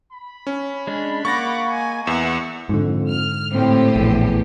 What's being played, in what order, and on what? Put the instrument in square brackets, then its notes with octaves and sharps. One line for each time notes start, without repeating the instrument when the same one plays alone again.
[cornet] B5
[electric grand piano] C#4
[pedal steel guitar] G#3 D4
[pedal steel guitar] A#3 [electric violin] F#5 D6 [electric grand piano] C#6 A6 A#6
[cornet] G#3 [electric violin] G#5
[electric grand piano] E2 [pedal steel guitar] E5 [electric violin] F#5 C#6
[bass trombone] F2 [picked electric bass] G#2 D3
[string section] F6
[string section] A2 G4 [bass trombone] C4
[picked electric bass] A#1 [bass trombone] E2